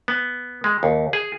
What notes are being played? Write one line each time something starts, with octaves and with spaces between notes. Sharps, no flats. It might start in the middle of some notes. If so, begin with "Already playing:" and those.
B3
G#3
D#2
G#4